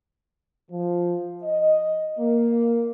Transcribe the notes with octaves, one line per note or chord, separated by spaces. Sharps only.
F3
D#5
A#3